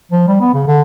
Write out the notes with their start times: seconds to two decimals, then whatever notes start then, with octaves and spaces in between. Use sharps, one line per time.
0.11 F3
0.28 G3
0.41 B3
0.54 C#3
0.67 D3